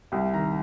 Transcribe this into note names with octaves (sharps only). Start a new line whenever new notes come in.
C2 G5
D#3 A#5